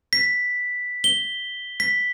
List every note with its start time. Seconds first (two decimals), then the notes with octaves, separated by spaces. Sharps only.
0.13 B6
1.04 G7
1.80 B6